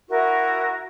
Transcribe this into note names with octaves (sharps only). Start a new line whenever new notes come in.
E4 F#4 A#4 C#6